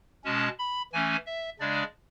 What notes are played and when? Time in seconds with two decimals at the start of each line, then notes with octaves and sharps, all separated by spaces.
0.24 B2 G#3 C#4 A5
0.59 B5
0.93 E3 A3 C#4 G#5
1.26 E5
1.59 C#3 G#3 D4 D5